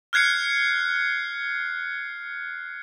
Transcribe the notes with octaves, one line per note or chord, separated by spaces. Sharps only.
F6 F#6 G#6 C7 C#7